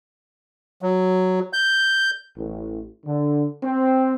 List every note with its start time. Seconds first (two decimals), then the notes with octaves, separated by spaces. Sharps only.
0.82 F#3
1.53 G6
2.38 A1
3.06 D3
3.63 C4